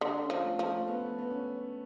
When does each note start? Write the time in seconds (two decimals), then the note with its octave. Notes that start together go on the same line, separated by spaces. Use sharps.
0.01 D3 D4
0.23 C#4
0.30 F3
0.45 A3
0.59 F3
0.66 A3
0.88 B3
1.06 A3
1.18 B3
1.30 C#4